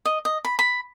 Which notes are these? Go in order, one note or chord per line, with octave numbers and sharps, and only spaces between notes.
D#5
D#5
B5
B5